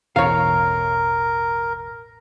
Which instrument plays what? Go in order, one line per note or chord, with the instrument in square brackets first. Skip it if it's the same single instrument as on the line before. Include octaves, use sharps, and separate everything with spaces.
[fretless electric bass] A1 E2 B2 [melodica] A#4 [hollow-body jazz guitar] C#5 F5